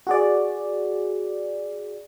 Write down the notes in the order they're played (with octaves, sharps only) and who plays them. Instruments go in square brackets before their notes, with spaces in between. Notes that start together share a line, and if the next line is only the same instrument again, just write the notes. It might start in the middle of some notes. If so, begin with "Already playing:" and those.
[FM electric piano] F#4 G#4 D5